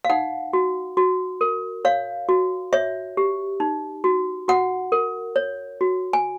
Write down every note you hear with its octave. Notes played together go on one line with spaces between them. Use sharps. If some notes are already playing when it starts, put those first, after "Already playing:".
F5
D#4 F#5
F#4
F#4
A#4
C#5 F5
F#4
C#5 E5
G4
D#4
F#4
F#4 F#5
A#4
C#5
F#4
G#5